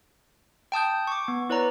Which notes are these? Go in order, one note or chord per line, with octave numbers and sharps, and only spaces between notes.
G5 A5 D#6 G6
C#6 D6
B3
E4 B4 C#5 D5 A#5